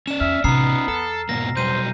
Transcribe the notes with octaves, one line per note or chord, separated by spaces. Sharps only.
C#4 D5 E7
E2 E5 F6
A1 C3 B3 C#4 D#4 A#5 E6 C7
E2 A4
G#2 B2 A#3 A#6
B2 F#3 G3 C5 G6 D#7